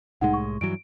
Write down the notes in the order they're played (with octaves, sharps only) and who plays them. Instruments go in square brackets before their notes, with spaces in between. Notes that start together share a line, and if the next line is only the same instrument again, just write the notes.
[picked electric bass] C2 A2 G#3 [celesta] D#4 F#5
[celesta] C#6
[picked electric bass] G2 E3 F#3 [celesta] D7